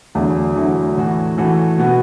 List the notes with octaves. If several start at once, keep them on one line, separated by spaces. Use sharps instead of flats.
E2 D3 F#3 A3 E4
E2 D3 F#3 A3 E4
A2 E3 A3 F#4
A2 E3 A3 F#4
B2 B3 F#4